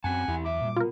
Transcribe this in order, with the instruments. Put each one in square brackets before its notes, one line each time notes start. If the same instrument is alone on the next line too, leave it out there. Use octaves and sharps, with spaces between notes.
[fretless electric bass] F#2 [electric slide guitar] F#3 C4 A5 [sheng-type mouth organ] F#5 G#5
[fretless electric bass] E2 [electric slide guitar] E4 G4
[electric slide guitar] F#2 E5 [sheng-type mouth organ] D6
[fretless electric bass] A#2 G3
[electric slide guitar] B2 [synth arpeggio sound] F4 A#4